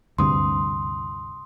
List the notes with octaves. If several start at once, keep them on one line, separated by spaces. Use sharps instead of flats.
D2 G2 C3 C6 D#6